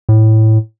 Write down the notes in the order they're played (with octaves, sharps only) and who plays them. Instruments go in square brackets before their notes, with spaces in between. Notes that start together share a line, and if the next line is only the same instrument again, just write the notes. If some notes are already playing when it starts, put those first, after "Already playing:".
[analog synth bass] A2